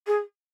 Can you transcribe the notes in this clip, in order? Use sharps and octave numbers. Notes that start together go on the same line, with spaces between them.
G#4